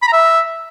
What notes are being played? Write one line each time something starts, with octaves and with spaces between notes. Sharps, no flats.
B5
A#5
E5